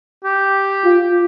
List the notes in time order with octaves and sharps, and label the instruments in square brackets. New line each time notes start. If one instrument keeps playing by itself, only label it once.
[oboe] G4
[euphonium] F4